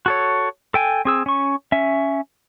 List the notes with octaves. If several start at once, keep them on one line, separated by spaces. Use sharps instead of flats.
F#4 A4 C#5
A4 G5 G#5
C4 G#4 E6
C#4 C#6
C#4 E5